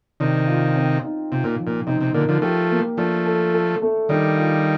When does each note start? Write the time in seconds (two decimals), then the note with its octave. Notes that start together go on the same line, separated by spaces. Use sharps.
0.20 C3 D#3 D4
0.47 F4
0.76 C4
1.04 D#4
1.32 C3 F4
1.44 A#2
1.59 F3
1.67 A#2
1.87 C3 D#4
2.01 C3
2.14 A#2 D3 A#4
2.28 D3 F3
2.42 F3 A3 G4
2.71 A#3
2.97 F3 A3 D4
3.26 A4
3.54 A4
3.82 A3
4.09 D#3 G3 D4
4.37 F4